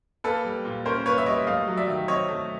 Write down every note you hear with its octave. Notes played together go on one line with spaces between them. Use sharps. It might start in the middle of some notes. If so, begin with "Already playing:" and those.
A#3 A4 B4
G3
A#2
C#4 A#4 C5
A#3 B4 C#5
E5
G3 C#5 D#5
A3 D#5 F5
F#3
D5 E5
D#3
C4 C#5 D#5
A3